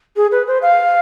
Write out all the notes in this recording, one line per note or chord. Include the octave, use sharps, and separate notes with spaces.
G#4
B4
C5
F5